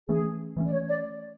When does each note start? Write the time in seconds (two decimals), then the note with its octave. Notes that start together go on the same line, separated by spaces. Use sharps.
0.09 E3 A3 C#4 G#4
0.57 E3 A3 C#4
0.66 D5
0.72 C#5
0.88 D5